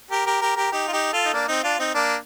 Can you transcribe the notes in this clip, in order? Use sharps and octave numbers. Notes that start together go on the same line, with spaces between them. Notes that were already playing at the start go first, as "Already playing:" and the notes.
G4 A#4
G4 A#4
G4 A#4
G4 A#4
D#4 G4
F4
D#4 G4
F4 A4
D#4
A#3 D4
C4 D#4
D4 F4
C4 D#4
A#3 D4